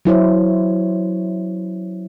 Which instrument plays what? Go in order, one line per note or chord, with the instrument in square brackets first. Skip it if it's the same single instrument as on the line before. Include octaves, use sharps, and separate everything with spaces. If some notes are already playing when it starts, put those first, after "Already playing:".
[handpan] F#3 E4 C5 C#5